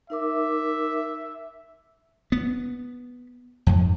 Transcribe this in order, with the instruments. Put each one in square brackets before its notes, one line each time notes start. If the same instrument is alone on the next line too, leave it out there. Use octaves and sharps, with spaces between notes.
[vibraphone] D#4 A#4 D6 [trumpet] E5
[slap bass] B3
F2 G#2